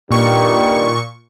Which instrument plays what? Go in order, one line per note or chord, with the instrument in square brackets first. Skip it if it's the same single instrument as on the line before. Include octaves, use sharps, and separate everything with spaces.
[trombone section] G2 D#3 G3 [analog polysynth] A#2 C#6